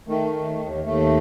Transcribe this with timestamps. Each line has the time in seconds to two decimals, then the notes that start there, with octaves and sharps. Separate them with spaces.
0.08 D#3 A3
0.33 D#2
0.59 D#2
0.84 D#2 A3